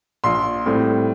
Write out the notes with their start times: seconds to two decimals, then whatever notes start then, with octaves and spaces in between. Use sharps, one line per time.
0.24 A#1 C6
0.66 A2 G3 C4